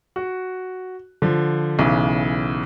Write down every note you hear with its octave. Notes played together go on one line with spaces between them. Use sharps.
F#4
D3 F3
B1 C#3 E3